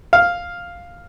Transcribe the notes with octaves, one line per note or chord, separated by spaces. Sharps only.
F5